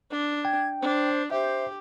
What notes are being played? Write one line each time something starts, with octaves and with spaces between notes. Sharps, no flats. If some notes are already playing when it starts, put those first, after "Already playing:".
D4
G5 G#6
D4 C5
G4 C5 E5